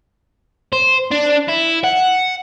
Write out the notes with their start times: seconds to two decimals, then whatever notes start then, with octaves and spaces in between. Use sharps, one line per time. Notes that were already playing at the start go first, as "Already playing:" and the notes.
0.73 C5
1.12 D4
1.49 E4
1.84 F#5